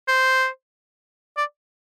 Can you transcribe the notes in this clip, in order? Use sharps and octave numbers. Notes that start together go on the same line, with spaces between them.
C5
D5